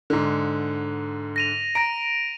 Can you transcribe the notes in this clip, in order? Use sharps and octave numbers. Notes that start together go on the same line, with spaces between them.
G#2 D3
A#6 D#7 F7
A#5 A#6 D7